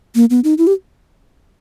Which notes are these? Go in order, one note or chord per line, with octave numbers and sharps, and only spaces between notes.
A#3
B3
D#4
E4
G4